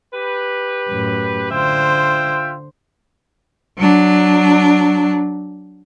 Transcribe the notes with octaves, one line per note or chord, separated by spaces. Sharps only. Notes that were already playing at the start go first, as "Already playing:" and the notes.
G4 B4
F#2 A2
D3 F4 C5 E5 G5
F#3 D4